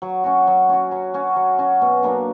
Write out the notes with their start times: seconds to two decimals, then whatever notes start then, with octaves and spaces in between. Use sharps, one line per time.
0.02 F#3
0.24 C#4 F#4
0.47 F#3
0.69 C#4 F#4
0.91 F#3
1.14 C#4 F#4
1.36 F#3
1.59 C#4 F#4
1.82 B2
2.03 F#3 A#3 D4